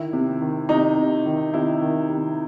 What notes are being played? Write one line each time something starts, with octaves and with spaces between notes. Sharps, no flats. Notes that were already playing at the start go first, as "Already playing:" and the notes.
Already playing: D#3 E4
C3
D#3
C3 D#4
C3
D#3
C3 E4
D#3
C3